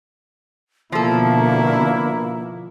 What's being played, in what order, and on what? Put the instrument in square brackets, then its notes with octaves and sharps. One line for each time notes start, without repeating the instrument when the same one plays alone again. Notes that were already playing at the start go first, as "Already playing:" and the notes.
[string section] B2 D3 [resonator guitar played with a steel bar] F3 A4 [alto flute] A#3 [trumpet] E4